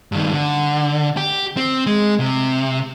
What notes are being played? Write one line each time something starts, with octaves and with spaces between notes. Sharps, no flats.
G2 D#3
D3
G4
C4
G#3
C3